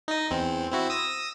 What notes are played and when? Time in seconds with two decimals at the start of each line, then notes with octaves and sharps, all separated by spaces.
0.08 D#4 D#5
0.31 E2 C4
0.72 C4 E4 F#4
0.90 D#6 E6 A#6